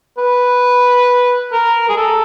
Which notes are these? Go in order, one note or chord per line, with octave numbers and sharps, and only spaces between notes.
B4
A#4
G#4
A4